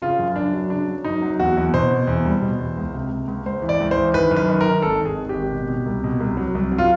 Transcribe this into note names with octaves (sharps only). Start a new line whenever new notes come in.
C#3 F4
F#2
F#2 D4
F#3
C#3 D4
F#3
F#2 D#4
F#3
E2 F#4
E2
B2 C5
B2
E2
G3
B2
E2
C#2
C3
C#2
C#2
C#2 C5
E3
D5
C#2
C5
E3
D#3 B4
F#2
B4
D#3
A#4
D#3
G#1 A4
G#1
G#4
D#3
G#1 G4
B2
B2
C2
B2
C2
F#3
C2
F#3
F4